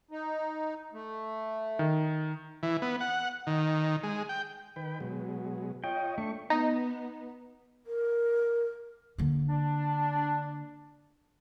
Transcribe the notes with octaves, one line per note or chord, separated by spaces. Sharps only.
D#4
A3
D#3
E3
B3
F#5
D#3
G#3
G5
D#3 B4 G5
B2 F#3 G#3
F4 C#5 D#5 G5
A3 D4 C#6
B3 D#4
A#4
D3 A#3
D4